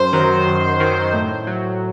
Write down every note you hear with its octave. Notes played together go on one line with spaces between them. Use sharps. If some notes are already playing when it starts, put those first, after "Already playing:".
Already playing: F#2 C5
D#3 F#3
F#2
D#3 F#3
A2
F#3